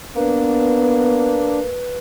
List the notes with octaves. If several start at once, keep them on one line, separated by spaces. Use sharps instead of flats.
A#3 B3 D4 B4